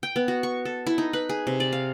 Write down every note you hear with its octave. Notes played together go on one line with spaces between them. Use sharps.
G5
B3
F#4
C#6
A4
E4
D#4
B4
G#4
C3
D5
F5